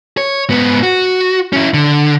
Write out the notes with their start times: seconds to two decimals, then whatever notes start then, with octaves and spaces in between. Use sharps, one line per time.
0.18 C#5
0.50 G#2 B3
0.83 F#4
1.53 C#4 E4
1.74 D3